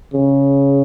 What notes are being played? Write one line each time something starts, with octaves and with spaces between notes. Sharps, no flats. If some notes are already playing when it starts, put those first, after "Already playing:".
C#3